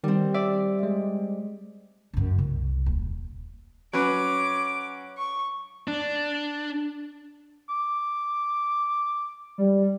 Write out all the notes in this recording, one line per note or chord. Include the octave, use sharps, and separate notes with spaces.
D#3 G3 C4
D5 E5
G#3
F#2 C#3
C2
D#1
F#3 C#4 B4 D6
C#6
D4
D6
G3